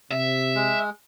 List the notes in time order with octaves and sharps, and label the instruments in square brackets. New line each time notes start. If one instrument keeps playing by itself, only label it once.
[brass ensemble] C3 [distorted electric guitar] E5
[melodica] G#3